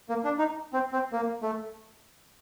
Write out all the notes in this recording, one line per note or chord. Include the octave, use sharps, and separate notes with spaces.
A#3
D4
D#4
C4
C4
A#3
A3